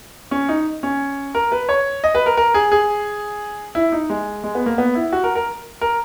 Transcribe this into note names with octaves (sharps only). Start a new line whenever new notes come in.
C#4
D#4
C#4
A#4
B4
C#5
D#5
B4
A#4
A#4
G#4
G#4
E4
D#4
G#3
G#3
B3
A#3
B3
E4
F#4
A#4
A#4
A#4